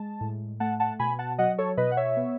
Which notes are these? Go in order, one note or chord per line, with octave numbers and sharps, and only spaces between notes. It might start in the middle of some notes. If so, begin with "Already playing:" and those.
Already playing: G#3 A5
A2
A3 F#5 A5
F#5 A5
B2 G#5 B5
F#5 A5
F#3 D#5 F#5
A4 C#5
B2 B4 D#5
F#5
C#5 E5
B3